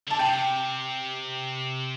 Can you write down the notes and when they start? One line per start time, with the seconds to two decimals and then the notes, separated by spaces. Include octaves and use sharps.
0.07 D3 A5
0.18 C3 G5